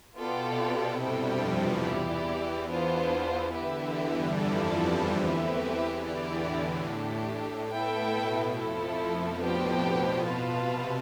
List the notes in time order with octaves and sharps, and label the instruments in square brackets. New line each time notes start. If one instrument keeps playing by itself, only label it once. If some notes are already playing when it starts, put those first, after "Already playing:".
[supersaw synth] B2 [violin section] B3 F4 A4 D5 G5
[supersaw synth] C3
[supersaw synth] G2 G3 [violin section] E4 A4 C5 G5
[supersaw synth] F2 F3
E2 E3
[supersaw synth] E2 E3 [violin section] E4 G4 D5
[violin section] B3 D4 F4 C5
[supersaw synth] D3 [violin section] B3 E4 G4 B4 E5
[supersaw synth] E2 E3
G2 G3
[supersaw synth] F2 F3 [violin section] E4 A4 D5 A5
[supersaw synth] E2 E3
[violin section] A3 C4 G4 B4 E5
[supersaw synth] D3 [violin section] E4 G4 D5
[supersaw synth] A2
A2
[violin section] A3 D4 G4
[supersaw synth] A2 [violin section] B3 E4 A4 E5 G5
[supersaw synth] B2
[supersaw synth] F2 F3 [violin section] A3 E4 A4
[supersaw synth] F2 F3
B2
[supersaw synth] A2 [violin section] B3 D4 G4 C5 G5
[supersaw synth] B2
[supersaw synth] B2 [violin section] B3 F4 B4 F5 A5
[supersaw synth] C3